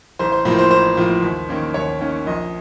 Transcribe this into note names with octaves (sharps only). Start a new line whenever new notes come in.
A1 C5
C5
A2 F3 A#3 C5
C5
A1 C5
A2 F3 A#3
D#2
D#3 A#3 C#4
D#2 C#5
D#3 A#3 C#4
A#1 D#5